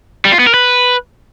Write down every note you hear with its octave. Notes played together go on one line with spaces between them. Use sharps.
G3
F4
B3
A#4
B4